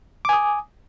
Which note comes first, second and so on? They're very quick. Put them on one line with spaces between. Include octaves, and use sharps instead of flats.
D6 G#5 D#6